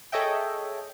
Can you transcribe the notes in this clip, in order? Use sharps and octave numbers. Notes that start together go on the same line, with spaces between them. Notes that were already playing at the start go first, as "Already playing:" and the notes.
G#4 A4 C#5 D#5 E5 G5